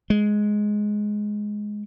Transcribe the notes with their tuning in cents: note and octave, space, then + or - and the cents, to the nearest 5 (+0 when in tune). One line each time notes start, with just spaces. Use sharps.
G#3 +5